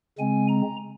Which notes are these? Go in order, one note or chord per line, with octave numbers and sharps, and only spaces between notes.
C#3 G#3 C4 G#5
A#5